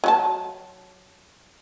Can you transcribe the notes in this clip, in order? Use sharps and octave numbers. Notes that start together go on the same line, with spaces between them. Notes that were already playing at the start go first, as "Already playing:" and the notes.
F#3 F#4 A5